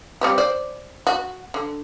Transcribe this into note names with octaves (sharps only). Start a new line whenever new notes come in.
G3 C4 G4
C5 D5
F#4
D3